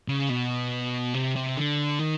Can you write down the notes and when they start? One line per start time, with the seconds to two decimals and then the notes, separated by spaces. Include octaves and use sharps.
0.08 C#3
0.30 B2
1.14 C3
1.36 C3
1.57 D3
1.99 D#3